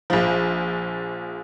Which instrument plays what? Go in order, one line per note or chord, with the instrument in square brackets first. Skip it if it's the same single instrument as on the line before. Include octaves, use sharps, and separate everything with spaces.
[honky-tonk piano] A#1 F3